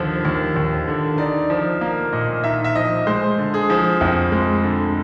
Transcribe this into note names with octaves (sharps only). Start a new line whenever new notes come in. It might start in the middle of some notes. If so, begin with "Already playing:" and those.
Already playing: D#2 D3 F3
D#2
D#2
D3
D#4 D5
F3
A#3
A#2 D#5
D#4 E5
E5
F3 D#5
G#3 C5
D3
G#4
F3
F2
G#3
D3